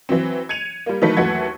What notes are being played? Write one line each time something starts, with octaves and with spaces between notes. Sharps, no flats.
E3 F#3 C4
G#6 C#7 D#7 F7
G3 A#3
D#3 E3 F#3 A3 B4
D#2 E3 F#3 A3 F#5 G#6